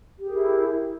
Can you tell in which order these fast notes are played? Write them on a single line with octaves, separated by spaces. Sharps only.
G4 G#4 A#4 E4